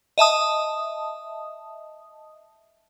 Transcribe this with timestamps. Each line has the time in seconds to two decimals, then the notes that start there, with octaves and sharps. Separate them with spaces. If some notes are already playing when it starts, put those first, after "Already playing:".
0.18 D#5 E5 A5 D#6